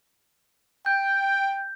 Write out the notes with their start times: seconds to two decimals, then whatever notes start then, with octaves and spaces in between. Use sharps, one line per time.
0.86 G5 G6